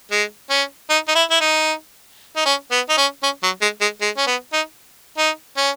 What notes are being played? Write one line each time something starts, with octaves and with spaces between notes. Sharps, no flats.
G#3
C#4
D#4
D#4
E4
E4
D#4
D#4
C#4
B3
D#4
C#4
C#4
F#3
G#3
G#3
G#3
C#4
B3
D#4
D#4
C#4